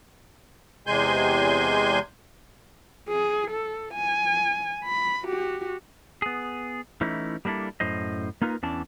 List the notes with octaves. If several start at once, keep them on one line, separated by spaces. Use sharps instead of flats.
E2 C3 G#3 G#5 C6 G6
G#4
A4
G#5
B5
F#4 G4
B3 G#4
E3 A3 C#4 D#4 E4
G3 A#3 D4 E4 A4
F#2 A2 C5 D#5
A#3 D#4 F4 A#4 B4
E2 E3 C#4 D4 A5